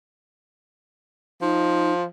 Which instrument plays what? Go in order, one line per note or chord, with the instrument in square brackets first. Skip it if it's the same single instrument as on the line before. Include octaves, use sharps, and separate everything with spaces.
[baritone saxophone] F3 [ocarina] D#4